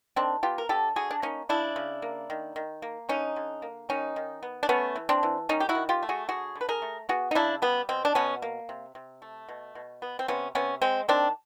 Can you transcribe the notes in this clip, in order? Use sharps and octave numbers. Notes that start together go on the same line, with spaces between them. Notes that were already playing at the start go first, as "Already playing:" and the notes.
D#3 C4 D4
B3 F4 G4
A#4
D3 G4 A4
D3 F#4 G#4
D4
A#3 C#4 D#4
C#3 D4 E4
C#3
A#3
D#3
D#3
A#3
D3 C#4 D#4
D3
A#3
D#3 C#4 D#4
D#3
B3
D4
A3 B3 C#4
E3
C4 D4
E3
D#3 C#4 D#4
G4
E4 F#4
D#3
F4 G4
A3
F#4 G#4
D3 F#4 G#4
D3
B4
G#4 A#4
A3
B3 F#4 G#4
D#4
C#3 D4 E4
G3 B3
B2 C4
D4
B2 B3 C#4
A#3
C3
C3
A3
B2
B2
B3
C4
C3 B3 C#4
C3 B3 C#4
G#3 C4
D#3 C4 D4